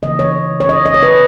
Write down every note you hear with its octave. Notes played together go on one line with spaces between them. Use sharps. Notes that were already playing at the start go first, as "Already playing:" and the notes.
C#3 E3 A#3 D#5
C#5
C#5
D#5
D#5
C#5
B4